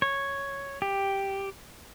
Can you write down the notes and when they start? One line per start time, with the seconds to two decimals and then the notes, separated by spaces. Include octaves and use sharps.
0.02 C#5
0.82 G4